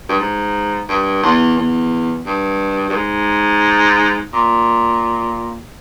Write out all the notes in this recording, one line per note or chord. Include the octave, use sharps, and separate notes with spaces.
G2
G#2
G2
E2
E2
G2
G2
G#2
A#2